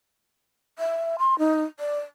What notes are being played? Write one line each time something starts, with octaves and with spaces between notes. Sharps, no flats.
E5
C6
D#4
D5